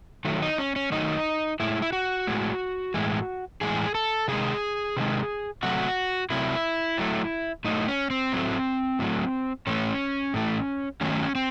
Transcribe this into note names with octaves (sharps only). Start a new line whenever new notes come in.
D#3 F#3 A3
D#4
C#4
C#4
D#3 F#3 A3 D#4
A2 G#3 E4
E4
F#4
A2 G#3
A2 E3 G#3
A2 E3 G#3 G#4
A4
C3 D#3 G#3 G#4
C3 D#3 G#3
C3 F#3 A3 F#4
C3 F#3 A3 E4
A2 F#3 A3
A2 F#3 A3 D#4
C#4
C4
A2 F#3 A3
A2 F#3 A3
A2 E3 A3 C#4
A2 E3 A3
D#3 F#3 A3 C#4
C4